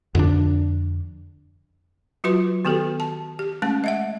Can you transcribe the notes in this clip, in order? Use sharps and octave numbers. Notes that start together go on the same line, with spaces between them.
F2 D3 C#4 D4
F#3 F4 F#4 B4 C6
D#3 B3 F#4 G4 A4
A5
G4
G#3 A3 C#4 A5
D#5 E5 F#5